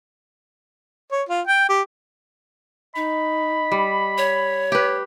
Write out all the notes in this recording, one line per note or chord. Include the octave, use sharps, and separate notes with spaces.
C#5
F4
G5
G4
D#4 D#5 B5
G3
C#5
G4 B4